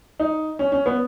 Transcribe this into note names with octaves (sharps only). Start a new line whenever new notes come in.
D#4
C#4
C#4
B3